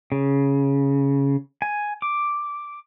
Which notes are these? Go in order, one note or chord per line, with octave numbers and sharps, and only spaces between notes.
C#3
G#5
D6